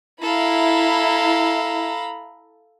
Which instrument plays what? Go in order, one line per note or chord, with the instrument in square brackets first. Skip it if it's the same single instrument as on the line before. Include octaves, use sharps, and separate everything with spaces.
[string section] E4 [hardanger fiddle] A4 F5 [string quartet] A#5 B5